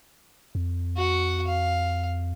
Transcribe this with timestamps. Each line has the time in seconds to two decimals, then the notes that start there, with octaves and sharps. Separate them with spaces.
0.55 F2
0.97 F#4 F#5
1.47 F5